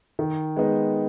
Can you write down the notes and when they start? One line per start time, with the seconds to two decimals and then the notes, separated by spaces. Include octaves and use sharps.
0.19 D#3
0.57 G#3 B3 D#4